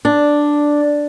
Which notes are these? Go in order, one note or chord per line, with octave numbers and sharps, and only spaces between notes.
D4